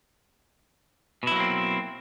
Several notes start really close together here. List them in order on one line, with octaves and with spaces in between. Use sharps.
B2 E4 F#3 A#3 C4